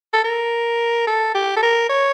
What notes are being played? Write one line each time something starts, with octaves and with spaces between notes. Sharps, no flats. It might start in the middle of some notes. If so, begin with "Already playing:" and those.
A4
A#4
A4
G4
A4
A#4
C#5